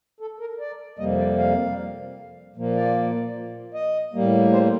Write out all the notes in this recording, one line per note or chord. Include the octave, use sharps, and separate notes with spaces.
A4
A#4
D5
F2 C3 G3 A#3 D#5
D5
F5
A#2 F3 A#3
D5
D#5
A2 G3 A#3
C5